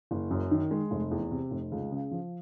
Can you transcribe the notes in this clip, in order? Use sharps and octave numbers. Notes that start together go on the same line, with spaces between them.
F#1
F#2
D#3
G#3
F1
E2
C3
F1
C#2
C#3
F3